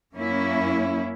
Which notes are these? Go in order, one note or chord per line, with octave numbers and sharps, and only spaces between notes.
F#2 A#3 C#4 E4